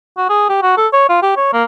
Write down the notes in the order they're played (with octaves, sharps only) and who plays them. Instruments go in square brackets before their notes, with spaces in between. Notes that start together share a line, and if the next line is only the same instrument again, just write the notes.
[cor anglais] F#4
G#4
G4
F#4
A4
C#5
F4
G4
C#5
A#3